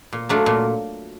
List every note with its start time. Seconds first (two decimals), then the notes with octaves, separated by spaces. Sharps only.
0.13 A#2
0.29 F#3 A3 D4 F4
0.46 A#2